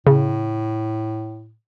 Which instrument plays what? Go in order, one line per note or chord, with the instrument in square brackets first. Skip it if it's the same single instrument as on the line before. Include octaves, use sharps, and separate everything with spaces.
[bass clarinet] A2 [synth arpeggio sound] C#3